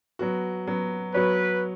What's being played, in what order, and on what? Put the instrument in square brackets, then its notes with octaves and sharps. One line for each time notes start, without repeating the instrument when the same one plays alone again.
[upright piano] F#3 B3 F#4
F#3 B3 F#4
[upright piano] F#3 B3 F#4 C#5 [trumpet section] B4